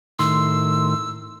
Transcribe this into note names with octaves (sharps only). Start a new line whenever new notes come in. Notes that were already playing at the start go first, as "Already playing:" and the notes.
A2 D#3 C6 E6